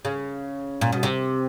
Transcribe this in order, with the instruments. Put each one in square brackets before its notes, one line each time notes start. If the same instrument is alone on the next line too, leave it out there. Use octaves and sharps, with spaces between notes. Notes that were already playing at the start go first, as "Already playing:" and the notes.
[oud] C#3
A#2
B2
C3